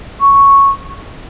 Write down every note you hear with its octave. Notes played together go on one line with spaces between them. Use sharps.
C#6